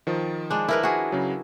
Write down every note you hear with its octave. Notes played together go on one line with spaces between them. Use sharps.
D#3 F3
G#3 D4
E4 A#4 B4
F#4 G#4
C#3 F#3